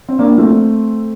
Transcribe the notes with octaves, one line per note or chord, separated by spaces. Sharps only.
C4
A#3 D4
A3 C4